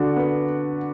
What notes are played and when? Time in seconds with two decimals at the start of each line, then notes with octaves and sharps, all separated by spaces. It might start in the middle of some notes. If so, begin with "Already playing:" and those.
Already playing: D3 F#4
0.16 B3